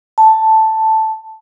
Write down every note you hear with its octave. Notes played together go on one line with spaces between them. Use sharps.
A5